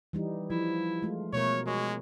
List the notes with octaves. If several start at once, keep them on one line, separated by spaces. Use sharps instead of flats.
E3 G3 D#4
F3 E4
G#3 A3 F4
B2 A3 A#4 C#5
G#3 F#4 A#4 C#5